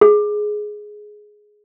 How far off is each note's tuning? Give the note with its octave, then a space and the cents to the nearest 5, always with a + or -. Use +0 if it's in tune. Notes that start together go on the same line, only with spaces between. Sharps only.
G#4 +10